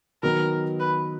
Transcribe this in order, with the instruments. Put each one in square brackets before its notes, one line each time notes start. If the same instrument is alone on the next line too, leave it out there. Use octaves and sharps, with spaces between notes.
[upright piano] D#3 F#3 B3 D#4 [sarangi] A#4
[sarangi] B4